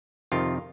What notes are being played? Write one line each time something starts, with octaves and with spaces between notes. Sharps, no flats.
F2 C3 D#3 F4